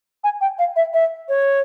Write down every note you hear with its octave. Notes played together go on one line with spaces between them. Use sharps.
G#5
G5
F5
E5
E5
C#5